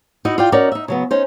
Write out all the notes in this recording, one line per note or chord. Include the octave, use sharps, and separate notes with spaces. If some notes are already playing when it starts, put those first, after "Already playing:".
D#4 E4 F#4 D#5
F4 D5 G5
C#4 D#4 F#4 A#4 D5
D#4 E5
C#3 F#3 B3
C#4 D#4 C5